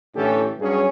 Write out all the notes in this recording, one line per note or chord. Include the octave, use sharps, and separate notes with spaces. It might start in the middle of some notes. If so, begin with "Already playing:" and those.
A2 D3 E3 C#4 G4 A4
G2 F#3 C#4 G#4